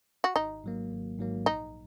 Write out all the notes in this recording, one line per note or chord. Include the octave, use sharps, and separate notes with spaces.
F#4
G#1 D#4
G#2 F#3 A#3
G#1
G#2 F#3 A#3
A#1 D#4